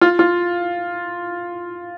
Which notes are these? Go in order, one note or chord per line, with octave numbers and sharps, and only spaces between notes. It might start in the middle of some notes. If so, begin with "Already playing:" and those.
F4
F4